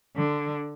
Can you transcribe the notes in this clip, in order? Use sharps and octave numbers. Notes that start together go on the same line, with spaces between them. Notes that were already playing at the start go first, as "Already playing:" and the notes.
D3